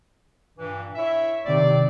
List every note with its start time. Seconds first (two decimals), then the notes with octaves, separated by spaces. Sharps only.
0.58 G2 A#2 E3
0.95 E4 C#5 E5
1.46 A2 C3 D#3 C4 D5